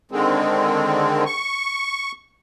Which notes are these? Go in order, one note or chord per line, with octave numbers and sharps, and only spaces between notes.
D3 D#3 G#3 C4
C#6